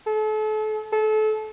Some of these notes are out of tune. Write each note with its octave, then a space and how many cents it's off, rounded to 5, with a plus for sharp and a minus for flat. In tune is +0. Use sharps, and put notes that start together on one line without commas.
A4 -35
A4 -30